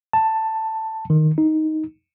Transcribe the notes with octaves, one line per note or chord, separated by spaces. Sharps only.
A5
D#3
D#4